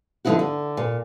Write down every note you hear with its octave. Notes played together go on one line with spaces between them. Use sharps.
D3 F3 F#3 D#4 E4 F#4
D3
A#2